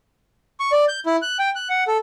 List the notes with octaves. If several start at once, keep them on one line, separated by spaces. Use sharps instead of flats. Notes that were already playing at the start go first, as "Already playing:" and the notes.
C#6
D5
G6
E4
F#6
G5
F#6
F#5
A4